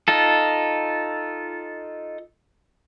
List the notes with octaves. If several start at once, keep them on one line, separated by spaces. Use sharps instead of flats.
D#4 F4 A4